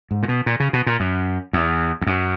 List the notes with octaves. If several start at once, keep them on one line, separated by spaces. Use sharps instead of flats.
G#2
A#2
B2
A#2
C#3
B2
A#2
F#2
E2
E2
F#2